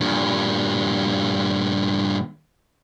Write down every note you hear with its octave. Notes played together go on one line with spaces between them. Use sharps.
G2 A#2